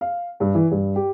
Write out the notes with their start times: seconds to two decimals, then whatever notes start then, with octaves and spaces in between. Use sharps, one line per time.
0.01 F5
0.40 G2
0.55 E3
0.71 G2
0.96 G4